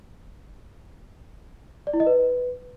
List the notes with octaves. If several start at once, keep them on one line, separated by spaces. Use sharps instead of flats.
D5
E4
D#5
B4